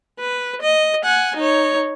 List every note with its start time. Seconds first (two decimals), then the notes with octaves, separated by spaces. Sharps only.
0.20 B4
0.62 D#5
1.05 F#5 G#5
1.36 D#4 C#5